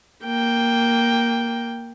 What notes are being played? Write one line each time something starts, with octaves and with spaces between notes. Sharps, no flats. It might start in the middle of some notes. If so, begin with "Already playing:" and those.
A#3 G5